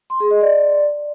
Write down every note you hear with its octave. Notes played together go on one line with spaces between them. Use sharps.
C6
G#4
D#5
D5